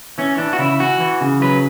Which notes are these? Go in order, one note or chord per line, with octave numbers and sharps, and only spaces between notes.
E3 C#4
E3 D4
F#4
C#3 E4
E3 F#4
E3
C#3
F#3 B4